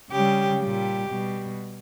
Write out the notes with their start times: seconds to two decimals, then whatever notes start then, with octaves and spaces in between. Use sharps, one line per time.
0.11 C#3 G3 G4
0.60 A#2 G3 G4
1.09 B2 G3